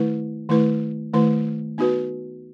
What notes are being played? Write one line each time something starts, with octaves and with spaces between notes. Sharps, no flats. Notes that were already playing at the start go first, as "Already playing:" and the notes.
Already playing: D#3 A3 E4 B4
D#3 A3 E4 B4
D#3 A3 E4 B4
B3 D#4 F#4 B4